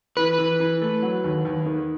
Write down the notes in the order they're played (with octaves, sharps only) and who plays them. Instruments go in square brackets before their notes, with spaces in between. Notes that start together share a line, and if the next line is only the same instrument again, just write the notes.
[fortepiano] E3 [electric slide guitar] B4
[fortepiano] E3
E3
A3
F#3
D#2
D#2
D#3